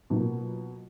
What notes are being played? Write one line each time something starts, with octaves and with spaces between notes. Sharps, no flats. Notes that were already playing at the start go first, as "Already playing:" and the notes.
B2 F#3 A#3 F4